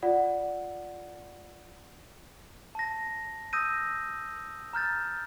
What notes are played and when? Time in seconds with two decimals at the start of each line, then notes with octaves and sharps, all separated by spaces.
0.03 F4 D5 F#5
2.75 A5 A#6
3.53 D#6 E6 G6 A#6 D#7
4.73 A#5 F6 G6 A6